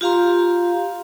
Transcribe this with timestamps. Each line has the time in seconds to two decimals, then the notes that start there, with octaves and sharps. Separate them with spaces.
0.01 F4 G4 F5 A#5 C6